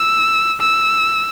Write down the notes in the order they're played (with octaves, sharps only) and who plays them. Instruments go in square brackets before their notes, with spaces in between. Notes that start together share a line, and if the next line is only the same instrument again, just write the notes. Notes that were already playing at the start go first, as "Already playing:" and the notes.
Already playing: [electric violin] E6
E6